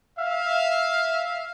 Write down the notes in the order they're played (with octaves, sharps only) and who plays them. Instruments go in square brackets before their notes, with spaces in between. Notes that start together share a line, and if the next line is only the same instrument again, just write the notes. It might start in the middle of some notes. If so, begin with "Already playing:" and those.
[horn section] E5 F5